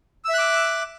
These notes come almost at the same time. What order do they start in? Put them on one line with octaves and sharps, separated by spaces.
E6 E5 F#6 D6